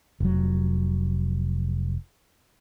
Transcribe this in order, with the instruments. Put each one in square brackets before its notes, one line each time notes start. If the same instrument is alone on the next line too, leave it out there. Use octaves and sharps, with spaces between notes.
[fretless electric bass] F1 F#3